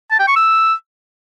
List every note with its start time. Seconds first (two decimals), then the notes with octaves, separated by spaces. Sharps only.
0.11 A5
0.19 G5
0.28 C#6
0.36 E6